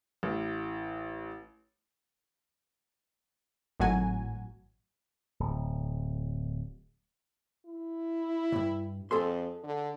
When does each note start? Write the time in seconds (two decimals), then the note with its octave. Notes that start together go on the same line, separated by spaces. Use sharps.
0.23 A1
3.80 G#1 A2 F#3 F#4 G#5
5.40 D1
7.66 E4
8.52 C#2 G2
9.11 F2 G#4 A4 C6
9.64 D3